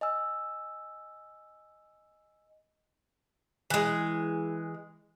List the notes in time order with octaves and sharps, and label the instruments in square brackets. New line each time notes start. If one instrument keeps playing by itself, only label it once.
[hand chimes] D#5 G#5 E6
[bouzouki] E3 G#3